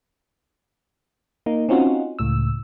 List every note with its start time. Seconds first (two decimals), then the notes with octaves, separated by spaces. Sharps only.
1.46 A#3 D#4
1.69 C4 C#4 D#4 F4 F#4
2.19 C#2 A2 E6